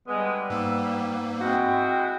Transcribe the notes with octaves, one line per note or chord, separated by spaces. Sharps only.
D3 G3 G#3 B3
G#2 A#3 E6
G#3 C4 E4 F#4 G5